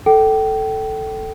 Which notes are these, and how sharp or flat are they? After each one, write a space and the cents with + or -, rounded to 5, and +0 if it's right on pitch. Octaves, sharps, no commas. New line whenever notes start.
A4 +0 G5 -25